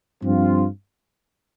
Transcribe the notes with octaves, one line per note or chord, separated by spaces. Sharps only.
G2 F3 C4 F4